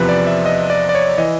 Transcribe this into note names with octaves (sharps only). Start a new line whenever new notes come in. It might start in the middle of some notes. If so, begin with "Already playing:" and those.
Already playing: E2 C3 F3 B4
D5
E5
D#5
D5
D5
C#5
E3 D#5